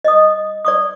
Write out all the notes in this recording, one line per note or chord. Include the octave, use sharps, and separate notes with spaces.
D#5 D#6
D5 C#6 D#6